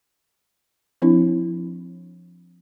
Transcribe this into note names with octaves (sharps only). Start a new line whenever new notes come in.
F3 C4 D4 E4